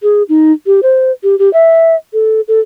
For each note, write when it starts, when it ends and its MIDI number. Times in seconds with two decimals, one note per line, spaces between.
0.03 0.23 68
0.29 0.52 63
0.66 0.80 67
0.83 1.11 72
1.23 1.38 67
1.39 1.52 67
1.53 1.95 76
2.13 2.41 69
2.48 2.60 69